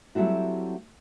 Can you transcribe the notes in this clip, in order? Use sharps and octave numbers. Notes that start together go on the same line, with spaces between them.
F#3 G3 A3 C4 E4 F#4